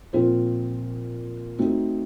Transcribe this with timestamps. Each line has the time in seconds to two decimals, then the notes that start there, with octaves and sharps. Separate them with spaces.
0.13 A#2 F3 C4 F4 C5
1.58 A3 C4 D#4 F#4